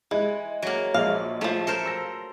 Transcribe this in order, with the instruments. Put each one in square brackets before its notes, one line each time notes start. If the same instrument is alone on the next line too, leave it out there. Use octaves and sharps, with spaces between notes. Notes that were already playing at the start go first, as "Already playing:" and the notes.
[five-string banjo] E3 [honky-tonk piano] G#3
[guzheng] F#3 A#3
[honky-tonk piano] A#1 G#3 [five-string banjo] F5
[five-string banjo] D#3 F3 [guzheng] A3
[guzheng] A4 A#4 C5
[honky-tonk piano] E6 A#6